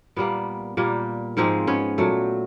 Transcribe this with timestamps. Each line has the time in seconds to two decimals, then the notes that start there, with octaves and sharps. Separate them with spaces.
0.16 A#2 G3 A#3 B3
0.77 A#2 G3 A#3
1.37 G#2 F3 G#3 A#3 C4
1.67 B3 C#4
1.98 A#2 F#3 A3